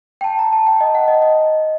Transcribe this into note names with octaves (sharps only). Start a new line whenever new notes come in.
G5
A5
A#5
A5
G5
D#5
F#5
D#5
D#5